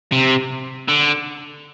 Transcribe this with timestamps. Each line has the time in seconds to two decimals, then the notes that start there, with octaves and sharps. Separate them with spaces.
0.12 C3
0.88 D3